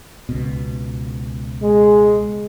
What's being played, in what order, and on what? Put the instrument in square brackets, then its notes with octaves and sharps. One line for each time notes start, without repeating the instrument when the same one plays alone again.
[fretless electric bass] C#2 B2
[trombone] G#3